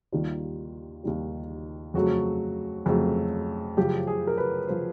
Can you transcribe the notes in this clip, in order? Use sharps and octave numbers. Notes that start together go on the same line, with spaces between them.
D#2 D#3 G3 F4
D#2 D#3 G3
F2 C#3 F#3 A3 F#4
F2 C#3 F#3 A3
F#2 C#3 F3 G4
G#4
A#4
B4
C#3 F3 C5